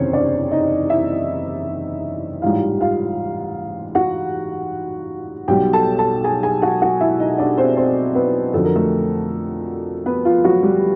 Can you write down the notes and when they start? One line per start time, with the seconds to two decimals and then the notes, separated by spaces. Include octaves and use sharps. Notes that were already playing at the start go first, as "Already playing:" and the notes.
Already playing: F#1 E2 C3 D#3 C4 C#4 C5 C#5
0.13 D4 D5
0.51 D#4 D#5
0.90 E4 E5
2.42 A1 G#2 E3 G3 F4 F5
2.81 F4 F5
3.95 F#4 F#5
5.48 B1 B2 G3 G4 G5
5.73 A4 A5
5.98 A4 A5
6.24 G#4 G#5
6.43 G#4 G#5
6.62 F#4 F#5
6.81 F#4 F#5
7.01 E4 E5
7.20 D#4 D#5
7.38 D4 D5
7.58 C4 C5
7.77 C4 C5
8.15 B3 B4
8.53 F2 D3 F#3 A4
8.64 A#4
8.75 A3 A4
10.06 B3 B4
10.25 F3 F4
10.44 F#3 F#4
10.63 G3 G4